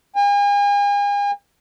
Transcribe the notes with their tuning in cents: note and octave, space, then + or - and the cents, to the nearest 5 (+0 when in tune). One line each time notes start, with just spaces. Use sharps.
G#5 -40